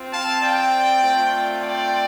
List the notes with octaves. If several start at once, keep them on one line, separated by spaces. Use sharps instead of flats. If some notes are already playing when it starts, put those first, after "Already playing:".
Already playing: C4 F4
F5 A5
D5 G5
A3 C4 F4
D5 G5